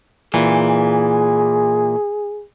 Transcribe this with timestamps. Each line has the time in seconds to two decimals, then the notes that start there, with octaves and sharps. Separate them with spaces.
0.34 A#2 E3 G#4